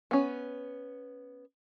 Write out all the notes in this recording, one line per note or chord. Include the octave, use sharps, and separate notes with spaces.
B3 C#4